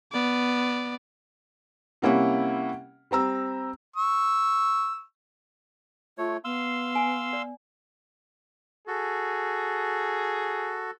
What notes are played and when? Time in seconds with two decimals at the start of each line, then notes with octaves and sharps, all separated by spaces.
0.12 B3 D5
2.02 C3 G3 A#3 C#4 E4 F#5
3.11 G3 C4 A#5 E6
3.96 C#6 E6
6.18 A3 F4 C#5
6.44 B3 F5 C6 E6
6.95 G#5
7.33 D5
8.87 F#4 G#4 A4